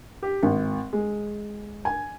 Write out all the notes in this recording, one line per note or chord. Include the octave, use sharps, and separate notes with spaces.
G4
G#1
G#3
G#5